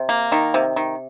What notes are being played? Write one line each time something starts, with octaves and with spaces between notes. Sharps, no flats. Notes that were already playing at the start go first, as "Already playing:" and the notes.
Already playing: C3
A#3
D#3
C3
D#3